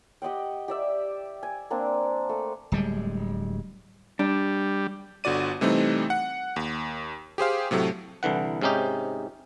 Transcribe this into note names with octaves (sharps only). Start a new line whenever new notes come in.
G4 D#5 F#5 G5
G4 D5 E5
G#5
A#3 C4 D4
A3
D1 G3 G#3
G3 D4
G1 D3 F#4 D5 D#7
C3 E3 G3 A3 C4 D#4
F#5
D#2
G4 G#4 C5 F5
A2 C3 F#3 A3
C2 D3 E3 F#5
G#2 C3 C#4 D#4 G4